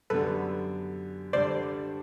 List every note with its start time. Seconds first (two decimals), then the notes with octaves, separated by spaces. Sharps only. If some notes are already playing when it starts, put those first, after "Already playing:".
0.10 F#2 D3 G3 B3 A4 B4
1.33 G2 D3 G3 C5 D5